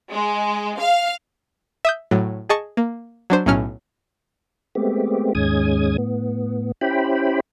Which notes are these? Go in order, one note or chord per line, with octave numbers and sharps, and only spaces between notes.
G#3
F5
E5 D#6 G6
A2 F#3
G#4 D#5 A5 C#6
A#3
F#3 D4 C5
B1 A2 F#3 C#4 F6 C#7
G#3 A3 B3 C4 G4
D#2 G#2 G#3 C#4 D#6 G#6
A2 B3
C#4 E4 G4 C5 G5 B5